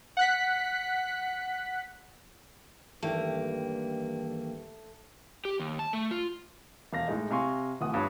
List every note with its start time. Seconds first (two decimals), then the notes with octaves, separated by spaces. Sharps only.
0.17 F#5 F#6 B6
3.02 G2 D#3 E3 A3 A#3 G5
5.45 G4
5.60 D#2
5.79 A5
5.93 A3
6.11 F4
6.93 E1 F5 A#6
7.08 A2 G#3 D#4
7.30 C3 F5 G#5 C6 C#6
7.81 D1 E3 F#5 D#6
7.92 G1 G2 C#5